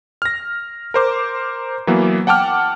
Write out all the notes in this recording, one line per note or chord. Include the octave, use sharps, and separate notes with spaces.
F6 A#6
A#4 C5 D6
E3 F#3 A#3 B3
F#5 G5 A5 D6 F6